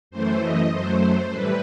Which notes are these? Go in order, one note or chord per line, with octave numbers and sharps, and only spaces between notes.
F#2 E3 A3 C5
D#5
F#2 F#3 A3 C5
A2 E3 G3 B4